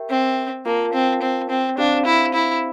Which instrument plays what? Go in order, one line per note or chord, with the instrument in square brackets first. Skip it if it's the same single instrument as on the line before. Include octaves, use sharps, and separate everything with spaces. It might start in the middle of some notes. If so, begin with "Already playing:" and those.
Already playing: [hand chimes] G4 A#4 E5 G5
[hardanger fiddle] C4
[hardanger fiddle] A#3 [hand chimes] F4 A#4 F5 A5
[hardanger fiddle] C4
C4
C4
[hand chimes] C4 G4 C5 F5 [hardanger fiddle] D4
[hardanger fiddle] E4
E4